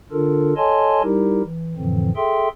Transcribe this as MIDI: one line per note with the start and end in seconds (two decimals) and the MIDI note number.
0.12 0.53 50
0.12 0.53 62
0.12 0.53 65
0.12 0.53 69
0.12 0.53 70
0.57 1.02 69
0.57 1.02 73
0.57 1.02 75
0.57 1.02 80
0.57 1.02 81
0.57 1.02 84
1.03 1.42 55
1.03 1.42 63
1.03 1.42 64
1.03 1.42 67
1.03 1.42 70
1.43 1.75 52
1.76 2.10 41
1.76 2.10 45
1.76 2.10 50
1.76 2.10 52
1.76 2.10 53
1.76 2.10 60
2.16 2.48 68
2.16 2.48 69
2.16 2.48 76
2.16 2.48 79
2.16 2.48 84